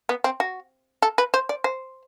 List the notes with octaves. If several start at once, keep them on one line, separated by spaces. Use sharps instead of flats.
B3
C4
F#4
A4
B4
C5
D5
C5